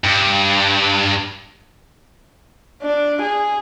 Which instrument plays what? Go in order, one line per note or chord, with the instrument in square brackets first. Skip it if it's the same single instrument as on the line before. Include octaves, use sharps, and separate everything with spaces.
[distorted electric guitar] G2
[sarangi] D4
G#4